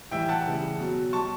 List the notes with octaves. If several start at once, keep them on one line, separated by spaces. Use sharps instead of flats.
A2 E3 G3 E5 G5
F#5 A5
C#3 E3 G3
B2 F#3
B2 G3 A5 C#6